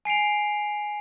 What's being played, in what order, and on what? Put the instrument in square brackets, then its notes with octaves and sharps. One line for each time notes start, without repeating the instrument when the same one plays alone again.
[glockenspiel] G#5 C7 D7 F7